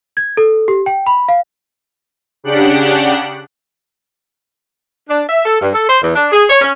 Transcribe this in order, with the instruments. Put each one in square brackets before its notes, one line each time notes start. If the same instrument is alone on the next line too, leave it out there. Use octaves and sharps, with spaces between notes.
[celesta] G#6
A4
G4
G5
B5
F5
[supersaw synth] C#3 D4 G4 F#5 F#6 D7
[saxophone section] D4
E5
A4
G2
A4
C5
E2
D4
G#4
C#5
C#4